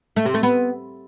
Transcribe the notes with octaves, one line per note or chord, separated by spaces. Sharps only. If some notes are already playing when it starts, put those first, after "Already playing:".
A3
C3
A3
B3